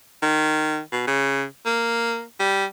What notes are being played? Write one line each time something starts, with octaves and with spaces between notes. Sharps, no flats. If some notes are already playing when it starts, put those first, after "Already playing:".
D#3
B2
C#3
A#3
G3